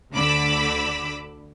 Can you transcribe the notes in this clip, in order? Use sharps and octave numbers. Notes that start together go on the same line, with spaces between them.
D2 D3 B5 D6 E6